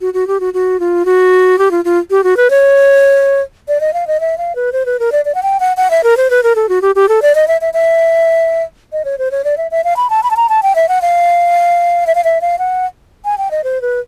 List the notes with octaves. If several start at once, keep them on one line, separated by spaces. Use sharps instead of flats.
F#4
F#4
G4
F#4
F#4
F4
F#4
G4
F4
F4
G4
F#4
B4
C#5
D5
D#5
F5
D#5
E5
F5
B4
C5
B4
A#4
D5
D5
F#5
G5
F#5
F#5
E5
A#4
C5
B4
A#4
A4
F#4
G4
G4
A4
D5
D#5
E5
E5
E5
D#5
C#5
C5
C#5
D5
E5
E5
F5
B5
A5
B5
A5
A#5
A5
G5
E5
F#5
F5
E5
F5
E5
F5
F#5
G#5
G5
D#5
C5
B4